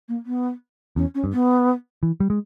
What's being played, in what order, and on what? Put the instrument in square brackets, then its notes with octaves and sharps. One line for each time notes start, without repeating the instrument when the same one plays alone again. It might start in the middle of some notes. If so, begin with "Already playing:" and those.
[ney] A#3
B3
[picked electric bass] E2 [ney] C#4
[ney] C#4
[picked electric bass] G2
[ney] B3
[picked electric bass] E3
G3
G#3